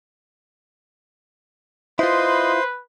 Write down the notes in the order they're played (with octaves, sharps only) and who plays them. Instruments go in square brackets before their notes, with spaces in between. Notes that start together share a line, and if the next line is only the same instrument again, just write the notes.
[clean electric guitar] E4 F4 [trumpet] B4 [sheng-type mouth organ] C5 [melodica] D#5 B5 C6